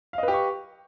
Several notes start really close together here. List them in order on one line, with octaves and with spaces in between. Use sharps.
F5 D#5 B4 G4 C#6